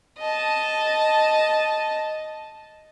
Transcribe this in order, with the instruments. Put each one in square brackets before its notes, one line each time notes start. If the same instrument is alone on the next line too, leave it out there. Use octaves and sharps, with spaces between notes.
[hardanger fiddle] D#5 A5